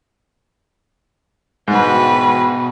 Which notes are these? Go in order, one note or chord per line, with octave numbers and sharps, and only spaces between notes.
G#2 B2 F#4 B4 G5